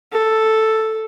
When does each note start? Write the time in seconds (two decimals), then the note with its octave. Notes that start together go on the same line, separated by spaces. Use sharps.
0.12 A4